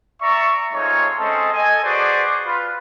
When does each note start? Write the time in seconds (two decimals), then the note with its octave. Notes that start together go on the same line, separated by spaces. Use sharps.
0.21 D5 E5 A#5 C#6
0.73 G#3 A3 C4 D#4 F4 C#5
1.18 G#3 C4 C#4 A4 D#5 A5
1.53 A4 D#5 G#5
1.83 F#4 G#4 B4 C5 D5
2.46 F4 B4